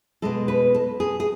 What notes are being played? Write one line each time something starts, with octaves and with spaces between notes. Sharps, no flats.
B2 G#3 A4
B4
A4
G#4
G#4